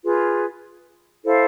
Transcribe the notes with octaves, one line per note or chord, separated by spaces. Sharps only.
F4 G#4 B4
E4 A4 C5 F5